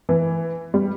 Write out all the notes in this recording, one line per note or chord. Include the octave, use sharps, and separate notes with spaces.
E3
G3